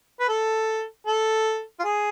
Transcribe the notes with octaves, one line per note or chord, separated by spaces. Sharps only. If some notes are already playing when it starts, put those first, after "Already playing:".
B4
A4
A4
F4
G#4